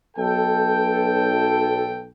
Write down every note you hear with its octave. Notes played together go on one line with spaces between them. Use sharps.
B1 A4 G5